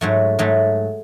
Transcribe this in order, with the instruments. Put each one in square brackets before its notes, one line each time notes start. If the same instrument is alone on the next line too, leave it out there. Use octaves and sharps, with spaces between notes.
[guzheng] G#2 F#3 A3
G#2 F#3 A3